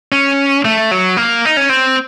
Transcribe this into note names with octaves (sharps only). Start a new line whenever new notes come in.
C#4
A3
F#3
A#3
D#4
C#4
C4